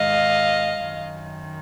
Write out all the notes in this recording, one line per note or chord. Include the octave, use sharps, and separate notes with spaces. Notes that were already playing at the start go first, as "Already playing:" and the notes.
Already playing: G#2 D#3 D#5 F5
F#2 D#3